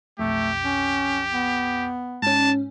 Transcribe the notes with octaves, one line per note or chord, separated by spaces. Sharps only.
B1 F2 A3 G4
C#4
B3
G#2 C#4 A5